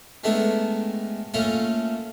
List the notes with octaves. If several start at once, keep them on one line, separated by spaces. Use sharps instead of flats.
D#3 G#3 A3 B3 D4 E4
A3 A#3 C#4 E4 F4